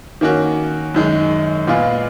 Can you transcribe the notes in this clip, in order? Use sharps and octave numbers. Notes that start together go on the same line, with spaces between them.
D#3 A#3 C#4 F#4
F#2 D#3 G#3
A#2 G#3 B3 F4 G#4